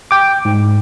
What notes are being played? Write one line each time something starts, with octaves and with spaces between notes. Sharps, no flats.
G5 D6
G#2